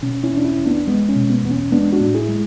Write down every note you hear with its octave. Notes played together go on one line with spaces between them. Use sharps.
B2 C#4
C#4 E4
E2
D4
C#4 E4
E2
B3 D4
G#3 B3
C#4
B2
B3
E2 B3
C#4
G#3 B3 D4
D4 F#4
A2
E4 G#4
G#3